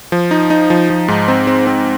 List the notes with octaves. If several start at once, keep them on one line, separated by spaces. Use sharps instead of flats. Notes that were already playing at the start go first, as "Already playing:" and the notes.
F3
D#4
D#4
F3
F3
G#2
C4
C4
C4